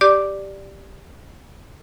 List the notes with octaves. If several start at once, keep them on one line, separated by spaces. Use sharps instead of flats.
G4 D5 D6